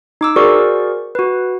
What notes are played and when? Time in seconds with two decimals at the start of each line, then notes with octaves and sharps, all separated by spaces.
0.21 D#4 D6 E6
0.36 F#4 G#4 A#4 C5 D5 C#6
1.15 F#4 B4